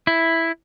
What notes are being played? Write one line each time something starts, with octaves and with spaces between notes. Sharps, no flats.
E4